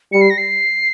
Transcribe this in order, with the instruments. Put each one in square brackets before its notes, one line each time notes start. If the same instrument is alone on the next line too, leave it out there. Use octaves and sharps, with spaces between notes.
[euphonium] G3 [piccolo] C#7
[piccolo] C7
A#6
C7